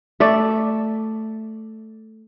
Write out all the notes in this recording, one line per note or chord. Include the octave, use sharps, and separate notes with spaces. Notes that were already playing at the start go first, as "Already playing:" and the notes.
A3 D5 E5